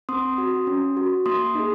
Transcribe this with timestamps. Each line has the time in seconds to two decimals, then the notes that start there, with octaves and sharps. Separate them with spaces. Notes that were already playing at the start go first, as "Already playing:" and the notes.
0.09 C4 C6 D#6
0.38 F#4
0.67 C#4
0.97 F#4
1.26 A#3 C6 D#6
1.55 D#4 G#4